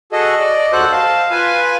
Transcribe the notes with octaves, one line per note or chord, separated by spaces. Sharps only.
F#4 G#4 A4 D#5
D5
D#2 F#4 A4 C5 F#6
F5 A5
F4 B4 G#5